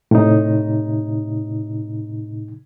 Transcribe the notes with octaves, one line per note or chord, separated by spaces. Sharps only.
A2 C3 D#4